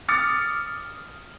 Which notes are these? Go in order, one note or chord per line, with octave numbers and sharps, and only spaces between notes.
D6 D#6 F6 A6 C#7